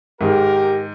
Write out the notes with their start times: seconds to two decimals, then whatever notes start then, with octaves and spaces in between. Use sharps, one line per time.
0.21 G#2 D#3 G4 A#4